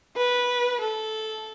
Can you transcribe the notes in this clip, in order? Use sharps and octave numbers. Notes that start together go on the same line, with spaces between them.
B4
A4